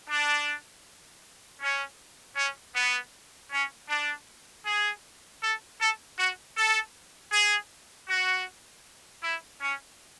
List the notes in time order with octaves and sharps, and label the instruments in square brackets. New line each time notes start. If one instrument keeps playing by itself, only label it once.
[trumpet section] D4
C#4
C#4
B3
C#4
D4
G#4
A4
A4
F#4
A4
G#4
F#4
E4
C#4